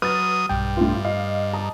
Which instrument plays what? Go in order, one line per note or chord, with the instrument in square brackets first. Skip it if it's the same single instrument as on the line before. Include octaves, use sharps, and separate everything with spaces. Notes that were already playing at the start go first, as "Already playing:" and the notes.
[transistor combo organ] F#3 D#6 [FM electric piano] B4 [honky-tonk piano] F6 A6
[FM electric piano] B1 G5 [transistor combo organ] G2
[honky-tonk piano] A2 F4
[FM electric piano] D#5 [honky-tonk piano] F5
[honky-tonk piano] A5 A#5 D#6